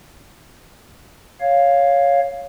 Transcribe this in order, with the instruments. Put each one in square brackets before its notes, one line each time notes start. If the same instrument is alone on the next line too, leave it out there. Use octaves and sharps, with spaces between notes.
[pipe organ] C#5 F5